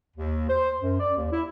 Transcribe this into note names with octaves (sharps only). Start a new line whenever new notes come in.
D#2
C5
F#2
D5
D#2
E4